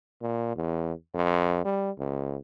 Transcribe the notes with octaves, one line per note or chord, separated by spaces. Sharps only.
A#2
E2
F2
G3
C#2